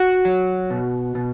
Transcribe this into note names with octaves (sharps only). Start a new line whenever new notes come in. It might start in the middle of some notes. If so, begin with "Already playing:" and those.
Already playing: F#4 F#5
F#3
B2
B2